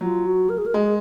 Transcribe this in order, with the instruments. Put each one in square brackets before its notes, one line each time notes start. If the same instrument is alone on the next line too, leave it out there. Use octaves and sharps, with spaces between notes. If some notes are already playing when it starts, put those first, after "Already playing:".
[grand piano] F#3 [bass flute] F4
[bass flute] F#4
A#4
G#4
A#4
[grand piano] G#3 [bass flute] G#4